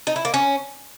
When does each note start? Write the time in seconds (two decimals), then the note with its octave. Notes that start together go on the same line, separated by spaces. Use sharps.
0.07 D#4
0.16 E4
0.25 A#3
0.34 C#4